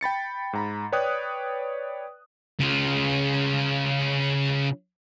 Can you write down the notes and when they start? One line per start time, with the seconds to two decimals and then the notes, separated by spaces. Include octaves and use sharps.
0.01 G5 B5 A6 C#7
0.53 G#2 A#5 B5
0.92 B4 C#5 D5 G5 D#6 F#6
2.60 C#3 F4